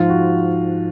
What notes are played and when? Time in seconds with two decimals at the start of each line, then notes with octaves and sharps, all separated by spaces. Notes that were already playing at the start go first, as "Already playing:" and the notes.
Already playing: G#2 F3 F4
0.09 F#4